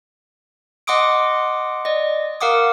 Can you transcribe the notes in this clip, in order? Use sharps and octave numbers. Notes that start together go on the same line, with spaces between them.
D#5 F#5 C6 D6 D#6 D7
D5 D#5
A#4 F5 F#5 D6 D#6